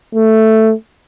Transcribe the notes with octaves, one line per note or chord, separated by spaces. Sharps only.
A3